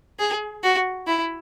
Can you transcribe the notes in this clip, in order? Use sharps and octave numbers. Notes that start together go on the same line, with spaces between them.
G#4
F#4
E4